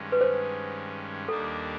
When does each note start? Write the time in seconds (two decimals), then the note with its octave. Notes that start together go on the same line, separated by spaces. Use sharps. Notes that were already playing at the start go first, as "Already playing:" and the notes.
Already playing: G2 D#3 G#3 C#4
0.12 B4
0.21 C5
1.28 D#2 D#3 G3 A#3 D4 A4